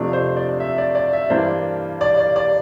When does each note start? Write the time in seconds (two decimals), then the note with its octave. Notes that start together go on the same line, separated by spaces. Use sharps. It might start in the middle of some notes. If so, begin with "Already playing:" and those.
Already playing: F2 C3 F3 A3 D4
0.13 C5
0.36 D5
0.60 E5
0.78 D5
0.95 D5
1.13 E5
1.30 G2 E3 A#3 D4 C5
2.01 D5
2.17 D5
2.36 D5